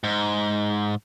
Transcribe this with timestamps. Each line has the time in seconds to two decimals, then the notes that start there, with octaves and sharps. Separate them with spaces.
0.04 G#2